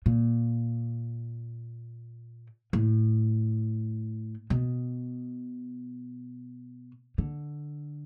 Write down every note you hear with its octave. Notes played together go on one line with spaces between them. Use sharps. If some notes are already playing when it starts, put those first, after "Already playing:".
A#2
A2
B2
D3